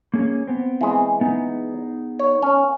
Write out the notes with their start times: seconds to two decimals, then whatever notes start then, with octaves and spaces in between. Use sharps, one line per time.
0.14 A#3 C#4 G#4
0.48 B3 C4
0.81 E3 G#3
1.21 B3 D#4 G#4
2.19 C#5
2.42 C#4